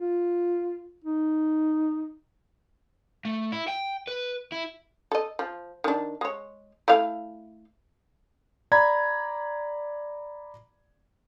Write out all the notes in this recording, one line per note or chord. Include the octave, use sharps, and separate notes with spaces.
F4
D#4
A3
E4
G5
B4
E4
A4 D#5
F3
D#3 D4
G#3 C#5
A3 E4 F5
D5 A#5 B5 G#6